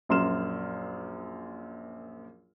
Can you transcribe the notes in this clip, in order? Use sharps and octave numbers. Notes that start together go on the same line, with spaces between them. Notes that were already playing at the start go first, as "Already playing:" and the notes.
A#1 F#2 C6 F6 E7